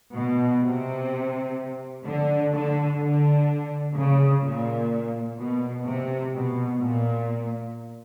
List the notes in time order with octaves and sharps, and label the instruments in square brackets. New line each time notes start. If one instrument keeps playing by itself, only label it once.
[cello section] B2
C3
D3
D3
D3
C#3
A#2
B2
C3
B2
A#2